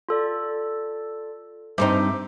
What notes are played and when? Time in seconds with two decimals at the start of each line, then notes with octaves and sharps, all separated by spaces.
0.09 F4 A4 D5
1.78 G2 C4 D#4 C5 E5 D6